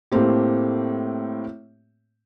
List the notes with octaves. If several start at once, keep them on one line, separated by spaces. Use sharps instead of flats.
A2 A3 A#3 C4 G4